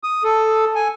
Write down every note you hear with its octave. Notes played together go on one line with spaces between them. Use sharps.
D#6
A4
G#5